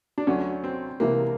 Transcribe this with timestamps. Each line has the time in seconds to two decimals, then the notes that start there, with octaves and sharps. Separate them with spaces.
0.18 D4
0.27 D2 D3 F#3 C#4
0.64 C4
1.00 C2 C3 E3 G#3 A#3